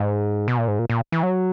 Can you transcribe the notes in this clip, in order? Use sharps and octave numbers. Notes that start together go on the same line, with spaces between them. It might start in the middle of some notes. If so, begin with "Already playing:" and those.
Already playing: G#2
B2
A#2
G#2
A#2
A#2
E3
F#3